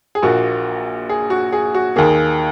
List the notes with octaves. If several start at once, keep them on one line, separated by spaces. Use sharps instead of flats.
G#4
A#1 A#2 A#3 F#4
G#4
F#4
G#4
F#4
D#2 D#3 A#3 G#4